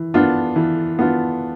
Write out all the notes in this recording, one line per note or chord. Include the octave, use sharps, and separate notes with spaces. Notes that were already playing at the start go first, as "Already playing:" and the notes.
Already playing: E3
B3 D4 F4
E3
B3 D4 F4